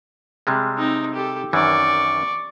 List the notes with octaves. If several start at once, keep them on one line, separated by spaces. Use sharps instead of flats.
C3 G3 G#3
C4 D#4
G4 A4
F#2 D#3 E3 D5 C#6